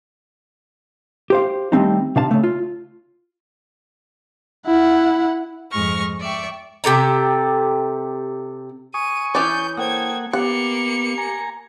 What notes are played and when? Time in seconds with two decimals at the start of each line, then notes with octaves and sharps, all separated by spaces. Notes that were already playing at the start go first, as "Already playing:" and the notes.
1.30 G4 C5 F5
1.72 D#3 G3 A3 C4 D4 D#4
2.16 C3 D4 F5 A5
2.31 C#3 A3
2.44 F4
4.66 E4 F#5
5.71 F2 G#2 G#3 C#6 F6 A#6
6.20 D5 E5 G5 C#6
6.84 C3 G4 A4 A#5
8.94 G#5 C#6 D#6 D#7
9.35 E3 C#4 D5 G6
9.77 A#3 A4 C5 F#5 G5 D#6 G#6
10.33 A#3 B3 G4 F#5 C#7
11.18 G#5 A#5